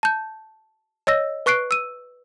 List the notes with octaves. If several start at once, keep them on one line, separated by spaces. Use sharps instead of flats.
A5 G6
C#5 D#5 E6 A#6
B4 C#6 F#6 C7 D7
E6 D#7